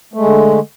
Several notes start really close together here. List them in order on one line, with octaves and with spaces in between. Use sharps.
A3 G#3 D3